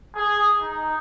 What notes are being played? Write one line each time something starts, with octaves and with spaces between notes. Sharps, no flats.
G#4
D#4